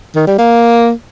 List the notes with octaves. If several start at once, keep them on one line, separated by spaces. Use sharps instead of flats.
D#3
G3
A#3